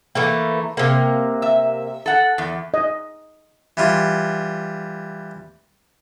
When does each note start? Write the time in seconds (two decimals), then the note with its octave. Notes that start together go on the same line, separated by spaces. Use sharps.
0.15 E3 A3 A#3
0.77 C3 A#3
1.42 E5
2.06 A4 F#5
2.38 E2
2.74 D#5
3.77 E3 G3 F4